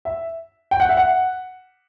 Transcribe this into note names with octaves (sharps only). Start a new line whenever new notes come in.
E5
G5
F#5
E5
F#5